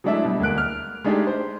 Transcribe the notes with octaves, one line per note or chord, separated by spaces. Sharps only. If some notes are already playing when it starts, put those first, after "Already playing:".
F#3 G#3 A3 D4 E4 E5
B2 G3
D2 G#3 A#3 F#6 D7
F6
G#3 A3 D4 D#4 G4 G#4
C5